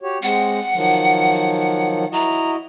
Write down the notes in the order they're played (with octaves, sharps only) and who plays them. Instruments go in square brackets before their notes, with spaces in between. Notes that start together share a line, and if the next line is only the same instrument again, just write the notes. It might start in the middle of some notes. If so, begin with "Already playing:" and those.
[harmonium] F#4 G4 C#5
[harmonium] G#3 C4 [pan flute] F#5
[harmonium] D#3 F3 F#3
[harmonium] E4 F#4 D#5 [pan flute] A#5